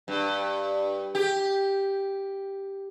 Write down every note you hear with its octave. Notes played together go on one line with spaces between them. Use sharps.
G2
G4